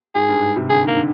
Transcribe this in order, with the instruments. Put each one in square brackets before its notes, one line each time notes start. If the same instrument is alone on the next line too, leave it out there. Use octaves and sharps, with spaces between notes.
[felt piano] G#2 [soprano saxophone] G#4
[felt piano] G2
G#2
C3
[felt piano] D3 [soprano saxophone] G#4
[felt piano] D#3 [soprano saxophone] A#3
[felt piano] D3